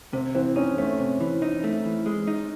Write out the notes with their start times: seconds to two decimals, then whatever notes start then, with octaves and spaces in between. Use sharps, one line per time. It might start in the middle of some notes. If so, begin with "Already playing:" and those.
0.13 C3 C4
0.35 E3 C4
0.56 C#4 D#4
0.77 A3 C4
0.99 C3
1.20 E3
1.42 D#4
1.64 A3
1.85 E3
2.06 G#3
2.27 D#4